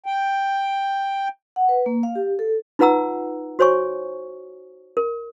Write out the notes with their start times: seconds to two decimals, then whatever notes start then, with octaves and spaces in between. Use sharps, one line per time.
0.06 G5
1.56 F#5
1.69 B4
1.86 A#3
2.03 F5
2.15 G4
2.39 A4
2.79 D#4 F4 B4 F#5 A#5 E6
3.59 F#4 C5 C#5 G#5 C#6
4.97 A#4